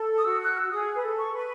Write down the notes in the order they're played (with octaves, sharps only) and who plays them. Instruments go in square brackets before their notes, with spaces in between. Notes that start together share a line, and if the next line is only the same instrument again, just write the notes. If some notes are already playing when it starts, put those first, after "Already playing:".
Already playing: [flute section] A4
[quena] D#6
[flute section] F#4 [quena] E6
[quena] F#6
E6
[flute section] F#4
[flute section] G#4 [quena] D#6
[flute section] B4
A4
[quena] C#6
[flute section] B4